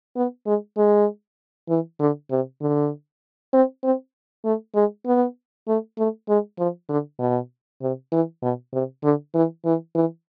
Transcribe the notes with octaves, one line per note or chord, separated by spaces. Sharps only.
B3
G#3
G#3
E3
D3
C3
D3
C4
C4
A3
G#3
B3
A3
A3
G#3
F3
D3
B2
C3
E3
B2
C3
D3
E3
E3
E3